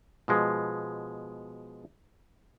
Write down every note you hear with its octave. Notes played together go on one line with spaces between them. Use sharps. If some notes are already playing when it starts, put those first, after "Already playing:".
B2 F3 G#3